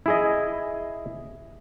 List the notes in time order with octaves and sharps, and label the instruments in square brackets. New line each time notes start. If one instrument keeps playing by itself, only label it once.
[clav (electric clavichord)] E4 G#4 D#5